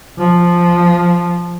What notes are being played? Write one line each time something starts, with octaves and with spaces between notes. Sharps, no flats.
F3